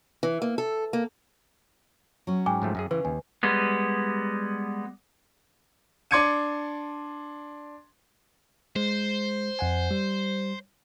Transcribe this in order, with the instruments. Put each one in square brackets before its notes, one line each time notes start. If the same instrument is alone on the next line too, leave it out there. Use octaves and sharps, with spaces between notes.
[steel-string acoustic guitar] E3
A#3
A4
A#3
[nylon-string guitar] F#3 C#4
[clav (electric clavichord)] G#2 [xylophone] G5 G#5 D6
[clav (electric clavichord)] G#2 F3 A3
F#2 C#4 G#4
[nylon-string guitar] C#3 [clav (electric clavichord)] E3 [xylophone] B4
[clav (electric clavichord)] D#2 [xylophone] G#5
[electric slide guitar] G3 G#3 B3
[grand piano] D4 C6 D6 G#6 C#7 D#7
[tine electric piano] G#3 [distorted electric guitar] C5
[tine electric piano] F2 F#5 G#5
G3